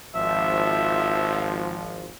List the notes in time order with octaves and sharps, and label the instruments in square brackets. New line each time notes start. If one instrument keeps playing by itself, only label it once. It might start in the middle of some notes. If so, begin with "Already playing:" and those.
[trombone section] G#1 F3 [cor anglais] E5